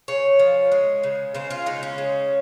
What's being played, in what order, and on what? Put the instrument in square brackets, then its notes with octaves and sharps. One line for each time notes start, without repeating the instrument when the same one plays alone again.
[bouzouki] C#3 C#5
F3
G#3
C#3
C#3 C5
F4
G#3 D#4
C#4
C#3